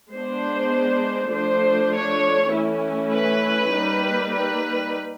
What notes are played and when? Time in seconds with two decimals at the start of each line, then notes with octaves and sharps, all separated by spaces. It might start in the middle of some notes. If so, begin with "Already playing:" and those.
0.12 G#3 B3 D4 C5
1.32 F3 A3 D4 C5
1.92 C#5
2.53 E3 A3 C#4 E4
3.14 B4
3.73 G3 A#3 D#4
4.34 B4